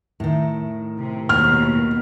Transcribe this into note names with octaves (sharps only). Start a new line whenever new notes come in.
A2 D#3
C3
D#2 B2 F6